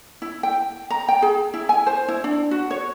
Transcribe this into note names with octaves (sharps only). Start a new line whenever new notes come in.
E4
G5
A#5
G5
G#4
E4
G#5
C5
E4
D4
F#4
C#5